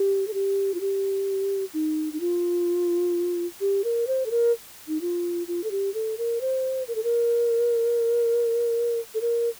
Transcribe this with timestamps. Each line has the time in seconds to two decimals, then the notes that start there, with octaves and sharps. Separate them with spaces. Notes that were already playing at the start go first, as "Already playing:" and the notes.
Already playing: G4
0.27 A4
0.34 G4
0.74 F4
0.81 G4
1.74 D#4
2.13 D#4
2.20 F4
3.61 G4
3.84 A#4
4.07 C5
4.26 A4
4.31 A#4
4.88 D#4
5.01 F4
5.48 F4
5.64 A4
5.71 G4
5.94 A4
6.18 A#4
6.41 C5
6.88 A#4
6.95 A4
7.04 A#4
9.15 A4
9.21 A#4